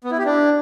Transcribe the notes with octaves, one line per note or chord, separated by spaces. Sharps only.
B3
E4
G4
D4